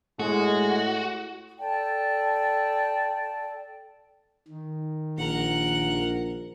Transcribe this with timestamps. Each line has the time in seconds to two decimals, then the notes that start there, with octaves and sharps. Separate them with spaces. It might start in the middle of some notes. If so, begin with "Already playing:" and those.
0.19 A2 G#3 F#4
1.59 A4 D5 G5 A5
4.48 D#3
5.18 A#1 A#4 F#5